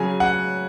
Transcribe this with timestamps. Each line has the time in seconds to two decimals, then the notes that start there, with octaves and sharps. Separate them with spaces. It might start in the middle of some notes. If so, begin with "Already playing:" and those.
Already playing: C#3 F#3 G#5
0.20 F#5